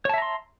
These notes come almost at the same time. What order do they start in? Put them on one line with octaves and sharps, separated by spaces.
C#5 A5 E5 A#5 C6